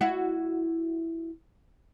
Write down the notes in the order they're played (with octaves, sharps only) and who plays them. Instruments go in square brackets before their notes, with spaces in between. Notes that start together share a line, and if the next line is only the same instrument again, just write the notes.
[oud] E4 F#4